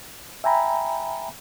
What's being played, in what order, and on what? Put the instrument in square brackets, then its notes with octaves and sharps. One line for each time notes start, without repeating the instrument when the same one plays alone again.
[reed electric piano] E5 G5 G#5 A#5 B5